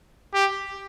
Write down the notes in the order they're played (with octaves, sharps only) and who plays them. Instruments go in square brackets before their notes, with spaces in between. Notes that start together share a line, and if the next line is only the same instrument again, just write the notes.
[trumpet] G4